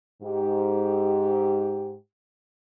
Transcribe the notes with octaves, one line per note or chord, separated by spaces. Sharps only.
G#2 G4